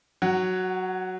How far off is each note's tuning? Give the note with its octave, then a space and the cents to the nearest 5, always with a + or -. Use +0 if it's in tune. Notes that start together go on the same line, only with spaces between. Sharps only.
F#3 +0 F#5 +35